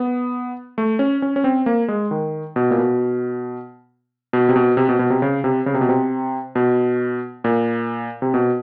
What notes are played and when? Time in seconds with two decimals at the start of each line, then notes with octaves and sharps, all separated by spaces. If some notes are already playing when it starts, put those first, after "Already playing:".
Already playing: B3
0.78 A3
0.99 C#4
1.22 C#4
1.36 C#4
1.44 C4
1.66 A#3
1.88 G#3
2.11 D#3
2.56 B2
2.71 A#2
2.78 B2
4.33 B2
4.49 C3
4.56 B2
4.77 C3
4.89 B2
4.99 B2
5.10 C3
5.22 C#3
5.44 C3
5.66 C#3
5.74 C3
5.81 B2
5.89 C3
6.55 B2
7.44 A#2
8.22 C3
8.34 B2